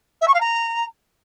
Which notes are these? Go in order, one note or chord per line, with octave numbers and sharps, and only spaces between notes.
E5
C#6
F5
A#5